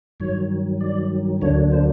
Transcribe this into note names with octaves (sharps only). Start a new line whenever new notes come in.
G2 D#3 F#3 C#5
D5
D2 D3 F#3 A#3 D4 C#5
C5